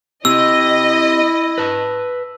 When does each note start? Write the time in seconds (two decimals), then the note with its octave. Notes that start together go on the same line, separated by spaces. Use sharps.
0.25 C4 E4 G4 D#5 E6
1.58 B4 A5